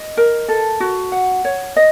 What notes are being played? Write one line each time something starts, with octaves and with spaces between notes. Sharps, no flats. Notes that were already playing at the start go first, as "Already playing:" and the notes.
Already playing: D#5
A#4
A4
F#4
F#5
C#5
D#5